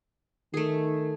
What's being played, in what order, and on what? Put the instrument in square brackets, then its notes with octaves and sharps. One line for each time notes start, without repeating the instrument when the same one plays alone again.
[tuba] D#3 [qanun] A3 G#4